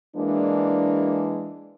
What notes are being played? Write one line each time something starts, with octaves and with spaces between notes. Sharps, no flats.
E3 G#3 A#3 D4